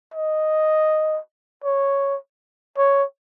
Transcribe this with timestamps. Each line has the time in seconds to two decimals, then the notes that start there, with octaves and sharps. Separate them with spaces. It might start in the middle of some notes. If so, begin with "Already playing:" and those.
0.14 D#5
1.64 C#5
2.77 C#5